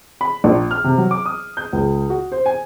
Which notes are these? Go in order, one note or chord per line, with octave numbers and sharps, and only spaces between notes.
B5
A#1
F6
C3
F#3
D6
D#6
G6
C#2
F#4
C5
G#5